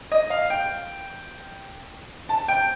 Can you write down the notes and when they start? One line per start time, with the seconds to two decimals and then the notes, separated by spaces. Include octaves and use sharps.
0.12 D#5
0.30 F5
0.50 G5
2.29 A5
2.48 G5